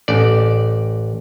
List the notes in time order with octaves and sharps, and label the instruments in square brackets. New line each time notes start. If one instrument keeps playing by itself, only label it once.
[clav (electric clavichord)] A1 D5